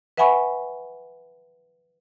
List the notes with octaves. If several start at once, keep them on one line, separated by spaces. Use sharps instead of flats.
B4 E5 F#5 G#5 B5 C#6